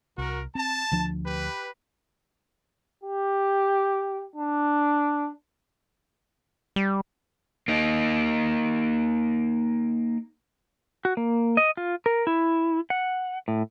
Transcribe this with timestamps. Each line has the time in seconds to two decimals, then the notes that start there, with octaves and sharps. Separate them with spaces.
0.18 C2 F#4 A#4
0.55 C4 A5
0.92 D2 F3 D4
1.26 G4 B4
3.04 G4
4.36 D4
6.76 G3
7.68 A#3 D#4
11.05 F#4
11.17 A#3
11.57 D#5
11.77 F4
12.06 A#4
12.27 E4
12.90 F#5
13.48 A2